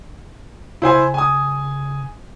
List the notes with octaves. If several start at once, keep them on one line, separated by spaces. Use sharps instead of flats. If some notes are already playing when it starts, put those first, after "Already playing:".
C#3 E4 C5 G#5
G#5 D#6